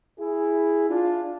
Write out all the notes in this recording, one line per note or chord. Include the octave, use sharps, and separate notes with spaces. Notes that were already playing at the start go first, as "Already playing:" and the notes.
E4 G#4
D4 F4